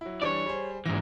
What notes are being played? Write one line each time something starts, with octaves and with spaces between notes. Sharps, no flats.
F#3 E4
E3 G3 D4 C#5 D5
G3 G#4 C5
G#2 E3 A#6